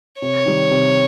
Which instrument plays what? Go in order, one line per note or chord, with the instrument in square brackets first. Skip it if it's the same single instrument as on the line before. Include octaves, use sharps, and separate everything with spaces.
[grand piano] C3 [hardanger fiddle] C#5
[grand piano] D#3 G3
C3